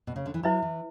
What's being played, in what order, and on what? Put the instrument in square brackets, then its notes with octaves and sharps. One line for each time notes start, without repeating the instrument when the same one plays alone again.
[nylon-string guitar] B2
C#3
D3
E3
[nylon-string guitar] F#3 [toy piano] E4 B4 E5 B5
[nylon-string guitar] E3